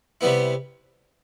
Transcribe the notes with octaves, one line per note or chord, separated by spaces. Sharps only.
C3 G3 B3 E4